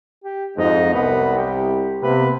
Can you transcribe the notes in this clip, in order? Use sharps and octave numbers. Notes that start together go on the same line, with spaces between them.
G4
F2 G#2 D#4
C2 B3
G4
C3 A#3 B3 B4